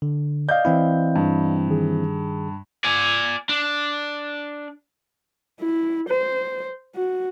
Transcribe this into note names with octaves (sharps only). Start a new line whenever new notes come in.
D3
D5 D#5 F5 G6
E3 C4 E4
G2
D#3 G#4
D5 G#5
D4
E4
C5
F#4